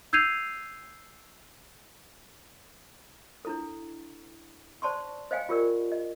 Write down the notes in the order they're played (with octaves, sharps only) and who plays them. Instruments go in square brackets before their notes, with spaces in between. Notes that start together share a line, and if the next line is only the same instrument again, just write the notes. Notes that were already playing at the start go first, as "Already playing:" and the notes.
[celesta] E6 G6 G#6 C7 D#7 F7
[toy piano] D4 E4 A4
C5 D5 A5 C6 C#6
C5 D#5 F5 G5 G#5
F4 G4 A#4 D5
D#5